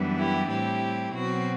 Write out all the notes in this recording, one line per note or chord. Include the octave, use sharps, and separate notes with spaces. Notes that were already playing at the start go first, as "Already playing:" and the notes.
Already playing: F#2 E3 G3 B3 D4
E4 G4
A2 G3 C4 E4 G4
B2 F#3 C4 F#4